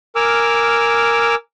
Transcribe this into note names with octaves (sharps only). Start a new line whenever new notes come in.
A#4 G#5 D6 E6 F6